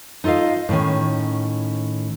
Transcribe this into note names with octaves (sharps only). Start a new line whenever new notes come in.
D#4 F4 A4 D#5 F5
A2 D#3 C#4